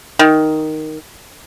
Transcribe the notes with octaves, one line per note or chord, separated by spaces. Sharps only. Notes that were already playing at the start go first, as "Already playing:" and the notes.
D#3